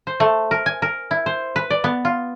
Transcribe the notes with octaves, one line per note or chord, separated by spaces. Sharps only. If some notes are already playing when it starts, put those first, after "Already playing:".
C5
A3
A#4
G#5
A#4
E4
C5
B4
D5
B3
F4